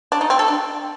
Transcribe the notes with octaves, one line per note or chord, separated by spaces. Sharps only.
D4
D#4
C4
A4
D4